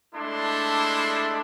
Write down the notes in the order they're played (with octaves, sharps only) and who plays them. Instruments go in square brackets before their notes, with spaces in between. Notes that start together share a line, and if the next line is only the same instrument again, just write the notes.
[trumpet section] G#3 A3 D4 E4 A4 C6